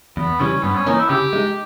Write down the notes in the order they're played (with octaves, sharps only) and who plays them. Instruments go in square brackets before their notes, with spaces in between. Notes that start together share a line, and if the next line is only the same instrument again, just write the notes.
[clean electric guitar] E2 [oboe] B3
[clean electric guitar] C#3 E3 G3 [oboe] C#4
[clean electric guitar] G2 [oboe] B3
[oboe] C#4
[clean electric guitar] E3 A#3 C#4 [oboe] D#4
[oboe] E4
[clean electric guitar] C#3 [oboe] G4
[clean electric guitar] G#3 D#4